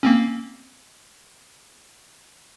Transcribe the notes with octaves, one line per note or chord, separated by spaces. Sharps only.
A#3 C4 C#4